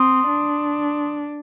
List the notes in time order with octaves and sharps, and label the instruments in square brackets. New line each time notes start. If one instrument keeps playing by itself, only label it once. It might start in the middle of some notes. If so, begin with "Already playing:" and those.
Already playing: [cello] C4 [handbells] C6 D#6
[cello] D4